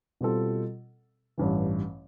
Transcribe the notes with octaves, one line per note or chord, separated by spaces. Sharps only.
B2 G3 C4 F4 A4
A1 G2 E3